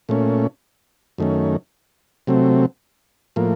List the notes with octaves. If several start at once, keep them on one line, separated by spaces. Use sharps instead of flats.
A#2 A3 C#4
F#2 D#3 A3 C#4
C3 F#3 A3 C4
A2 F3 A#3